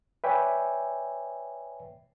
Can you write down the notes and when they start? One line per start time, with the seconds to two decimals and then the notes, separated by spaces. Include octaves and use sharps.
0.24 B4 C#5 D5 E5 G5 G#5